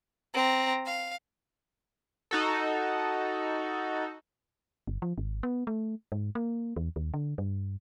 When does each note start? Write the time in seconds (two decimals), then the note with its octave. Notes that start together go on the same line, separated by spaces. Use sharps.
0.34 C4 A#5
0.85 F5
2.31 D#4 F#4 A4
4.87 G1
5.02 F3
5.18 G#1
5.43 B3
5.67 A3
6.12 G#2
6.35 A#3
6.76 E2
6.96 D#2
7.14 D3
7.38 G2